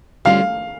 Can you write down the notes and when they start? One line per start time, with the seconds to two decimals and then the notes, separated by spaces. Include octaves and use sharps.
0.25 D3 G3 C#4 F4 F5